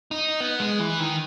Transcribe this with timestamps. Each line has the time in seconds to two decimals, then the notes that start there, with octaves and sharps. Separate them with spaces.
0.11 D#4
0.40 B3
0.60 G#3
0.79 E3
1.00 D#3